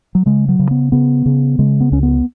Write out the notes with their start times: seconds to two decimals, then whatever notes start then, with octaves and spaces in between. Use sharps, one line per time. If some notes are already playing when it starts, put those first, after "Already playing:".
0.15 F#3
0.26 C#3 G#3
0.49 F#3
0.59 C#3
0.71 B3
0.92 C#3 B3
1.26 C#3
1.59 C#3 G#3
1.80 B3
1.92 C#2 C#4
2.03 B3